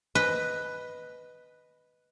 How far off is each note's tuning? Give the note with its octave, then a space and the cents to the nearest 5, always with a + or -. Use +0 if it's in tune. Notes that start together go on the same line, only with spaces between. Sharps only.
B4 +0 D#5 +0